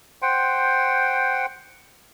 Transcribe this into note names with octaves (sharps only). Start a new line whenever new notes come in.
C5 F#5 G5 C6